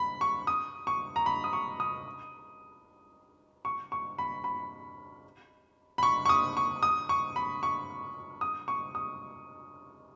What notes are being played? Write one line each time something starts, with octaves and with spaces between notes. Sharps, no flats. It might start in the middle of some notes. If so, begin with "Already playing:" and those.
Already playing: B5
C#6
D#6
C#6
A#5
B5
D#6
C#6
D#6
C#6
C#6
B5
B5
B5
C#6
C#6
D#6
C#6
D#6
C#6
B5
C#6
D#6
C#6
D#6